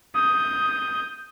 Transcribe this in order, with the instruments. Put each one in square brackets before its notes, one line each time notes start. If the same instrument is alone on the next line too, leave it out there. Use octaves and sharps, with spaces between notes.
[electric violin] D#6 G6